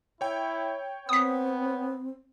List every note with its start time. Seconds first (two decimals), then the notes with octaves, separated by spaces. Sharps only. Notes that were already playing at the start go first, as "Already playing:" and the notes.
0.21 E4 C#5 G5
1.09 B3 C4 D#6 B6